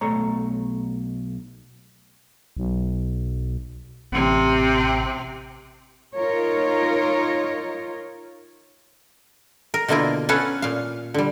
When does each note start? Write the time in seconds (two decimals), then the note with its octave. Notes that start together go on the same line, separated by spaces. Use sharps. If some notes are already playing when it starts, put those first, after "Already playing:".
0.01 B1 A3 C#5 A#5
2.57 B1
4.12 A1 C3 C4
6.17 D#4 F4 A#4 C#5
9.74 A#4
9.88 B2 D3 A#3 E4 F4 A#4
10.29 C#4 A4 B4 F5 F#5
10.62 A#2 F5
11.14 D3 G3